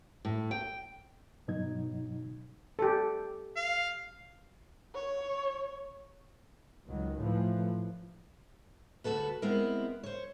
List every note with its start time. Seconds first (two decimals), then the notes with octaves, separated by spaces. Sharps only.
0.25 A2
0.51 G5
1.48 G2 B2 F#3 D#4 G#6
2.79 G4 A4
3.56 F5
4.95 C#5
6.88 C#2 D#3 F#3
7.19 A2 E3 F3
9.04 D2 G#2 F#4 A4 B4
9.42 G#3 B3 C4 E4 A#4
10.03 C5 C#5